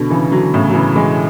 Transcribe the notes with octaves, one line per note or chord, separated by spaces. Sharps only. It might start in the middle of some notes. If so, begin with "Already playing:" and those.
Already playing: B2 D3
C#3 E3
D3 F#3
A2 C#3
F#3
C#3 E3
E3 G#3